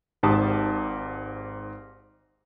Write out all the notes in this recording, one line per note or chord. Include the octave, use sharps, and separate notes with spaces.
G#1 G#2 G4 A5 D#6